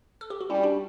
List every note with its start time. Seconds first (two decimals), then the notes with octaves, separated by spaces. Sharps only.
0.21 A4
0.30 G4
0.41 F#4
0.50 G3 C#4 E4
0.63 D4 F#4